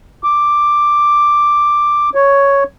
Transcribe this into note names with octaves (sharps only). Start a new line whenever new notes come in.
D6
C#5